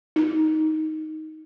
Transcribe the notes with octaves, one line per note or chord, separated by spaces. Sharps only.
D#4